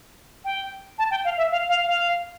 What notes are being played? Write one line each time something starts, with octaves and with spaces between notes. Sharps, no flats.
G5
A5
G5
F5
E5
F5
F5
F5